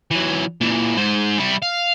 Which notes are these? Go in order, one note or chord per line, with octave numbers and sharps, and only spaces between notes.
E3 F#3
A#2 E3
G#2 C5
G3 E4
F5